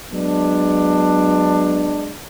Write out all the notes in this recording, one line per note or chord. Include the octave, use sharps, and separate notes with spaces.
F#3 G#3 B3 D4